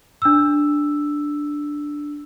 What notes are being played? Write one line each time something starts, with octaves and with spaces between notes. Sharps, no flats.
D4 E6